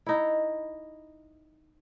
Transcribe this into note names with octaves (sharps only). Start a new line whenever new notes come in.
D#4 E4